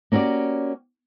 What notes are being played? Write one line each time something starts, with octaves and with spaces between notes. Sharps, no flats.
A#3 C#4 F#4 G4 D5